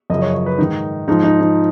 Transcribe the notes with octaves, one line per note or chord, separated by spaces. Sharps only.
F#2 C#3 F3 D#5
C#5
C#5
B4
G#2 D#3 D#4
G#2 F3 D#4
D#4
D#4